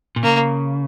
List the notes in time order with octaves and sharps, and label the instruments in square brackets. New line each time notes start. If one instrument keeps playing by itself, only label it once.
[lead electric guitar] A#2
[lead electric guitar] C#3 [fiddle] A#3